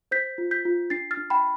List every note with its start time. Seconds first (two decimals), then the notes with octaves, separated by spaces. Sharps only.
0.11 C5 G6 B6
0.38 F4
0.51 G6 B6
0.65 F4
0.90 D4 A6 C7
1.11 F6 A6
1.17 D4
1.30 G5 B5